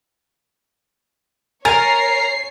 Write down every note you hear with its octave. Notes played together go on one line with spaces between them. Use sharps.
A#4 C#5 G#5 A#5 A6 C7